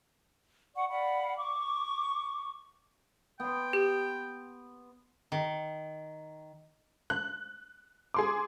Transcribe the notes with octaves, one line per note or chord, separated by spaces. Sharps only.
D5 F#5 C#6
D5 F5 F#5 B5
C#6 D6
B3 G5 C6
G4
D#3
F#6
G#4 C6 D6